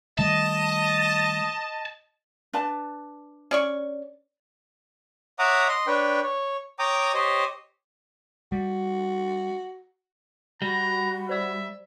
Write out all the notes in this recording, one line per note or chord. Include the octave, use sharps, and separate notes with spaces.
D#3 G3 A3 D#5 A5
D4 B4 A5
C#4 D5 C#6
C#5 E5 F#5 A#5 D6 D#6
D#5 C6
D4 B4 C#5 G5
C#5
C#5 G5 A#5 D6 D#6
G4 C5 C#5 D#5
G3 F#4
G3 F#4 A#5 B5
C5 D5 E5 E6